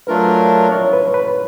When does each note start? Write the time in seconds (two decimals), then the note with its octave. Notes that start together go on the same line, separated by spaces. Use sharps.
0.07 F#3 A3 D4 F4 A#4 B4
0.72 C#5
0.93 B4
1.14 B4